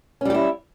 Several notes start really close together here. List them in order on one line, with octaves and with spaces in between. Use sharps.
C#4 G3 G4 E4